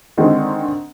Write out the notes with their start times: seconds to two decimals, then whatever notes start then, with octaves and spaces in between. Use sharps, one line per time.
0.18 D3 D#3 G#3 C4